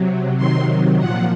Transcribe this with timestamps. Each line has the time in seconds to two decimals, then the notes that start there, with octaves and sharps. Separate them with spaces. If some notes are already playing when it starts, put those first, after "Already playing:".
Already playing: C3 F#3
0.37 C3 D#3 F#3 C6
0.98 A#2 F3 F#5